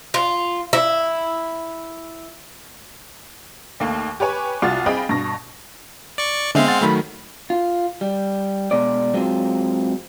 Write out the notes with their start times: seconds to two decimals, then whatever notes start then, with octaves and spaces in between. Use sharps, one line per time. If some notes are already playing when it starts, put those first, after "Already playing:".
0.14 F4
0.73 E4
3.80 D#2 A3 A#3
4.20 G4 B4 C#5 G#5
4.62 C2 F4 F#4 A6
4.86 C4 G#4 D#5 F5 G5 B5
5.09 G2 B2 A#6
6.18 D5 C#6
6.55 D3 G#3 B3 C4 E5 F5
6.68 F#5 C6 A6
6.81 D#3 F#3 A3 B5
7.50 F4
8.01 G3
8.71 B2 G#3 D5
9.14 F#3 G#3 C4 F4